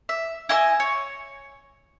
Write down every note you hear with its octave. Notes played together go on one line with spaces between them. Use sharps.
E5
E4 D#5 G#5 E6
C#5